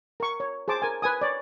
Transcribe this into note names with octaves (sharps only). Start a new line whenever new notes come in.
A#4 C#6
C#5
G#4 C5 A5 D6
A#4 G#5
B4 G#5 D#6
C#5 D5